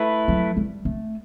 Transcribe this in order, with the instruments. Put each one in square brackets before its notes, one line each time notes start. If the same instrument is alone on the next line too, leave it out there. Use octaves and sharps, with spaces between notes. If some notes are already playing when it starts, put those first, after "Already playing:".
Already playing: [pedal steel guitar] A3 E4 B4
[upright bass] F#3
G3
A3